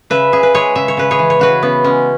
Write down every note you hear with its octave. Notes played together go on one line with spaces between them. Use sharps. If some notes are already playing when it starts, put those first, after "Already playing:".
C#3 B4 E5
C#3 G#4
B4
G#3 G#4 C#5
C#3 E5
C#5
C#3 B4
G#4 C#5
E3
C#5
C#3 F#4 B4
C#3 B3
G#3 C#4